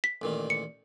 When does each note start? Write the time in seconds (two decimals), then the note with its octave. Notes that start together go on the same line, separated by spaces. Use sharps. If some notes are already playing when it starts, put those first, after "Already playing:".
0.04 B6
0.22 A1 A#2 D#3
0.50 C#7